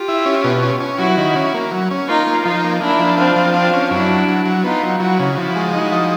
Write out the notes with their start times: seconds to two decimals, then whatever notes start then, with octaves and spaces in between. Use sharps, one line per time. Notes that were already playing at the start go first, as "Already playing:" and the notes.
Already playing: F4 G4
0.08 E4
0.26 C#4
0.44 B2
0.62 C#4
0.80 C#4
0.99 F#3 E4 F#4
1.17 D#3
1.36 C#4
1.54 A#3
1.72 F#3
1.91 C#4
2.08 A#3 D#4 F4
2.27 A#3
2.45 F3 D#4 F4
2.64 A#3
2.81 A#3 D4 E4
2.99 F3
3.18 C4 D4 F4
3.36 F3
3.54 C4 D4 F4
3.73 C#4
3.91 F#2 D4 E4
4.09 F#3
4.28 F#3
4.45 F#3
4.64 B3 D#4 F4
4.83 F#3
5.00 F#3 E4 F#4
5.19 C#3
5.37 F3 E4 F#4
5.56 G#3
5.73 D#4 E4 F#4
5.92 F3